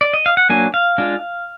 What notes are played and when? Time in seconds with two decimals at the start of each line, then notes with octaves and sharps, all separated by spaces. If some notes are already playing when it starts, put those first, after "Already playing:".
0.01 D5
0.14 D#5
0.26 F5
0.37 F#5
0.50 F#3 A#3 D4 G#5
0.74 F5
0.98 G#3 D4 F4